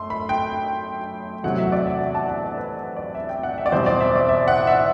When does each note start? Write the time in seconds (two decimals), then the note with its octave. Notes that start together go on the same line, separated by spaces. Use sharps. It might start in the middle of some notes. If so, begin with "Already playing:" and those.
Already playing: F#2 A3 C6
0.10 B5
0.29 G5
1.43 E2 C3 F#3 A3 F#5
1.58 E5
1.72 D5
1.87 E5
2.01 F#5
2.15 A5
2.29 A5
2.43 D5
2.57 B4
2.97 D5
3.15 E5
3.29 G5
3.43 F#5
3.58 E5
3.66 D5
3.72 E2 B2 G3 C4 C5
3.86 D5
4.00 E5
4.15 D5
4.29 E5
4.48 F#5
4.67 E5